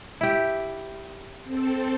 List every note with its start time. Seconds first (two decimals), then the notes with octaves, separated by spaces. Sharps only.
0.21 E4 G4
1.43 C4 A4